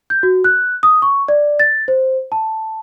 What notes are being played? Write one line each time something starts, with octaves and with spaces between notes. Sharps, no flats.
G6
F#4
F#6
D#6
C#6
D5
A6
C5
A5